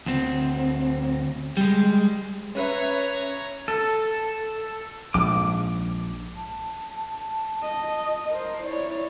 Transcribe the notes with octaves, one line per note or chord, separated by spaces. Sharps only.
D2 C4
G3 G#3
C#4 B4 C#5 E5 A#5
A4
A#1 G#2 D6
A5
A5
D#5
A#4 C5
E4 C#5 D5